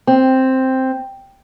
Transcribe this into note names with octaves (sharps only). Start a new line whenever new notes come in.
C4